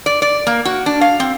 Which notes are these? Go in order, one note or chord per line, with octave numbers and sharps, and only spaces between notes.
D5
D5
A#3
F#4
D4
F5
C4